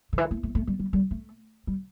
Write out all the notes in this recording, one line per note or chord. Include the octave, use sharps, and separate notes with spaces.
D3
E3
A3
A3
A3
G3
G3
G3
A3
G3